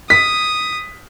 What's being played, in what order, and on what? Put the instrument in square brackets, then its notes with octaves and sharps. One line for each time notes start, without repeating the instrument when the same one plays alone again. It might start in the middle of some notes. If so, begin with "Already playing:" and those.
[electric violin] D#6 [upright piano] B6